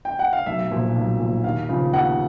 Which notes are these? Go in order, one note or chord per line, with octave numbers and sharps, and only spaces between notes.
G5
F#5
F5
B1 E5
A#2 F3
B1
A#2 F3
D#2 F5
C#3 F3
D#2 F#5